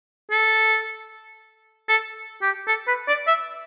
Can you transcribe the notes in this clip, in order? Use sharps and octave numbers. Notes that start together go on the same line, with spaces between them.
A4
A4
G4
A4
B4
D5
E5